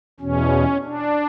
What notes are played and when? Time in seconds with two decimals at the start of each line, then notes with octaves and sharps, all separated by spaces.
0.20 E2 B2 C#4
0.84 D4